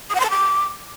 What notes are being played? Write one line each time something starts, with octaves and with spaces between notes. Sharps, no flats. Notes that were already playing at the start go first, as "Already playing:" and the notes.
D#6
F#5
C6
A5
D6